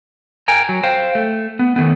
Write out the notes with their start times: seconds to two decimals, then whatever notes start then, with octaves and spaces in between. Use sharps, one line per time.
0.48 A#4 G5 G#5 A#5
0.69 F#3
0.83 C5 F5 G5
1.15 A3
1.59 B3
1.76 D#3 E3 A3 B3